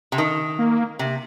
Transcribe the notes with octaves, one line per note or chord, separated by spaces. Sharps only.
C3
D#3
A#3
C3